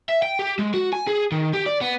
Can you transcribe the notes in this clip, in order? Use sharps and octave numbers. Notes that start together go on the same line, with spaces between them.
E5
G5
G4
G#3
F#4
G#5
G#4
D#3
G4
D5
B3